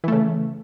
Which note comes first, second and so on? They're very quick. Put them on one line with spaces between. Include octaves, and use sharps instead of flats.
E3 A3 C#3